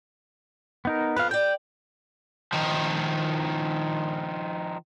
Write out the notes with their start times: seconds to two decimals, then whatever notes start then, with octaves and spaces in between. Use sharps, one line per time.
0.85 B3 D#4 A#4
1.17 F2 B3 B4 F5
1.31 D5 G5 G6
2.52 D#3 F3